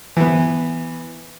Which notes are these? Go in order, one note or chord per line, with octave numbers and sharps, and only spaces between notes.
E3 B3